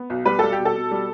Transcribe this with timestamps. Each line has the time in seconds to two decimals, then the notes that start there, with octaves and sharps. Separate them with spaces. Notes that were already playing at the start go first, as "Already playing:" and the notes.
Already playing: B3
0.10 B1
0.25 G3 B4
0.39 G3 A4
0.52 G4
0.58 B2
0.65 A4
0.75 B2
0.91 G3